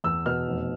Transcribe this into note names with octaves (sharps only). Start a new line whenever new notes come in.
E2 E6
B2 F6
F1